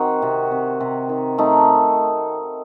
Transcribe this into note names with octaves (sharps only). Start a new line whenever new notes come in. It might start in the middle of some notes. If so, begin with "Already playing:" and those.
Already playing: D#3 C4 F#4
C3
C3
C3
D#3
A3 D#4